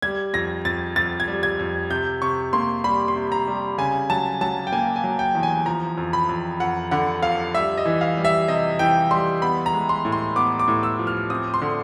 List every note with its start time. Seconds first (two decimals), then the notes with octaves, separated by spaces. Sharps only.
0.02 G3 G#6
0.34 F2 A#6
0.65 F2 A6
0.96 F2 A6
1.20 G#6
1.28 G3
1.43 G#6
1.59 F2
1.90 C3 G6
2.22 C3 C#6
2.53 A#3 C6
2.84 G3 B5
3.08 C6
3.16 C3
3.32 A#5
3.48 G3
3.78 C#3 G#5
4.10 F#3 A5
4.41 F#3 A5
4.67 G5
4.72 A#3 G#5
4.96 G#5
5.04 F#3
5.19 G5
5.35 E2
5.43 G#5
5.66 F3 A#5
5.98 F2
6.13 B5
6.29 F2
6.60 F2 F#5
6.91 D3 F#5
7.22 F2 F5
7.54 G3 E5
7.78 D#5
7.86 E3
8.01 F5
8.17 G3
8.25 E5
8.48 C3 D#5
8.79 E3 G5
9.11 G3 C6
9.42 B3 B5
9.66 A#5
9.73 G#3
9.89 C6
10.05 A2
10.12 C6
10.36 B3 D6
10.59 D6
10.68 A2
10.83 E6
10.99 F3
11.07 F6
11.30 C4 D#6
11.54 C6
11.62 D3